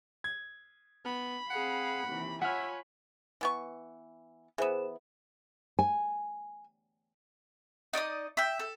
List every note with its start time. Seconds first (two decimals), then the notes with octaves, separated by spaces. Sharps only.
0.24 G#6
1.06 B3 B5
1.51 C4 G#4 F5 F#5
2.08 D#2 C3 E3
2.42 F4 C#5 E5 F#5 G#5 B5 F6
3.41 E3 B3 C#6
4.58 E3 B3 G#4 C5 E7
5.79 G#5
7.93 D#4 D5 D#5 D#6
8.37 E5 G5
8.59 A4